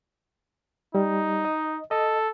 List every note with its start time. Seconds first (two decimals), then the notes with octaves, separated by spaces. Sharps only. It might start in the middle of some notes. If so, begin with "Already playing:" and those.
0.95 G3 D#4
1.45 D#5
1.91 A4 D#5